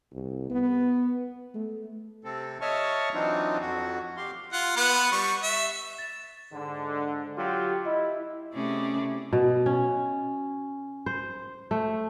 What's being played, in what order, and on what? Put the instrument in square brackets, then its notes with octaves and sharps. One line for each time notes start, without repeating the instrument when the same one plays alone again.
[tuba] C2
B3
A3
[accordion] C3 C4 A4
C#5 D#5 E5 A5 C#6 F6
E3 F#3 C4 D4 D#4 F4
F2 F#4
G4 F5 C6
[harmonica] F4 F#5
B3 B4 F#5
G3 C#6
E5
[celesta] A6 E7
[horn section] G#2 D3
F#3 F4 G4
[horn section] E4 [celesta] D#5 E6
[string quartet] C3 A3 C#4 E4 G#4 D5
[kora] B2
C#4
C5
A3